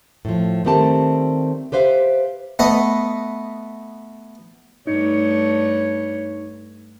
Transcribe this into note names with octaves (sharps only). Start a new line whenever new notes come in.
A2 F3
D#3 G3 A3 C4 G4 A5
G4 B4 C5 E5 F5
A3 B3 D#5
G2 A3 D#4 C#5